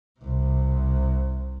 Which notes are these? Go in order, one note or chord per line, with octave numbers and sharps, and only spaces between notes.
C2 C3